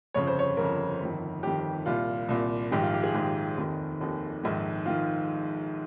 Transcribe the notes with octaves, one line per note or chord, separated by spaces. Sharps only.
G1 F2 C#3 C#5
C5
C#5
G1 F2 C#3 A#4
G1 F2 D#3
G1 F2 D#3 G4
C2 A#2 F4
C2 A#2
A#1 G#2 D#3 G4
F4
G4
G#4
A#1 G#2 D#3 G4
F1 D#2 D#3
F1 D#2 D#3
A#1 G#2 D#3
D#3 F4